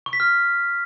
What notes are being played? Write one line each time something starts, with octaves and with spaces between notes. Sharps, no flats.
C#6
B6
F6